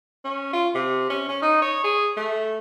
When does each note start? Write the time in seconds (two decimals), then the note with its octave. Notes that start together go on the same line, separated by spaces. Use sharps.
0.25 C#4
0.53 F4
0.75 C3
1.10 C#4
1.29 C#4
1.42 D#4
1.62 C#5
1.84 G#4
2.17 A3